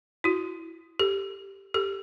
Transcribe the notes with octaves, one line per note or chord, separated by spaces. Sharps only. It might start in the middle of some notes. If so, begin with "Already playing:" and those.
E4 F#4
G4 A4
G4 A4